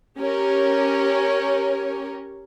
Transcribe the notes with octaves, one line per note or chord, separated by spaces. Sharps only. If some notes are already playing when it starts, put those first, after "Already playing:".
C#4 G4 A#4 C#5